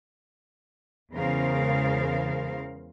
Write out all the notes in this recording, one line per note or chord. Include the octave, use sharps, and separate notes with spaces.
E2 C#3 G#3 A#4 C5 F5